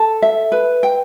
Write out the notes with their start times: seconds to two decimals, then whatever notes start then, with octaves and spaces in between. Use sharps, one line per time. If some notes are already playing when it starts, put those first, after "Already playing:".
Already playing: A4
0.22 E5
0.52 B4
0.83 G5